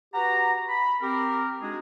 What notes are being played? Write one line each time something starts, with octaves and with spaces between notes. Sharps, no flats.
F#4 G4 B4 F#5 A#5
B5
C4 G4 A#4
G#3 D4 D#4 F#4 G#4